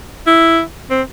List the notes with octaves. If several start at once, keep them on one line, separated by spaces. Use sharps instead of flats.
E4
C4